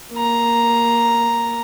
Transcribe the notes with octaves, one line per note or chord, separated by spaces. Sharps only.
A#3 A#5